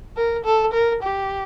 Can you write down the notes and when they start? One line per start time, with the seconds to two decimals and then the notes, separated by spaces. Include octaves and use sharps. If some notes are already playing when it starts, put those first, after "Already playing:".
0.17 A#4
0.45 A4
0.73 A#4
1.02 G4